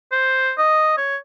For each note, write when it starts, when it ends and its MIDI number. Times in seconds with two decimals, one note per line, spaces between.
0.12 0.52 72
0.58 0.96 75
0.97 1.17 73